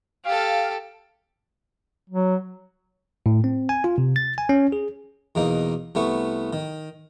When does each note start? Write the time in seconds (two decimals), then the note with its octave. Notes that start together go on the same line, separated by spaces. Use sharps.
0.25 G4 A4 F5
2.10 F#3
3.26 A2
3.44 C4
3.69 G#5
3.84 F4
3.98 C3
4.16 A6
4.38 G#5
4.49 C#4
4.72 G#4
5.35 E2 B2 A#3 D#4
5.95 C2 A3 B3 C#6
6.53 D#3